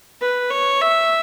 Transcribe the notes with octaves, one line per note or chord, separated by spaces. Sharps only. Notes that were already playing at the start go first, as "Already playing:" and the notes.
B4
C#5
E5